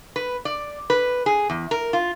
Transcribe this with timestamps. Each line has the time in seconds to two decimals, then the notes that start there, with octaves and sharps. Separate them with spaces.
0.16 B4
0.45 D5
0.90 B4
1.26 G#4
1.50 E2
1.71 A#4
1.93 F4